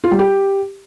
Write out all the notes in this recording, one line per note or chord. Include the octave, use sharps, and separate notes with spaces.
F4
G3
G4